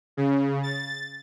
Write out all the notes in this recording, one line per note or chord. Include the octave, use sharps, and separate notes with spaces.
C#3
A6